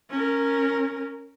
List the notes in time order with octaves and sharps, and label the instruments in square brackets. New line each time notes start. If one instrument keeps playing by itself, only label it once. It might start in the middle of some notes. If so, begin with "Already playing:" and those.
[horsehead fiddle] C#4 A#4